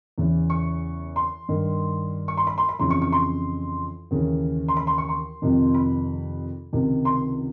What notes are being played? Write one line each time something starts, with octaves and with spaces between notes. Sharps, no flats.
E2 C#3 E3
C#6
C6
G2 D#3
C#6
C6
B5
C6
B5
F2 C#3 E3 C6
C#6
C#6
C6
D#2 C#3 E3
C6
B5
C6
C#6
C6
F2 C3 D#3
B5
C#2 C3 D#3
C6